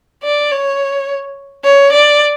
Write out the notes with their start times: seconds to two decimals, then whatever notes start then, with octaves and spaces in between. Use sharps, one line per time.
0.24 D5
0.52 C#5
1.64 C#5
1.92 D5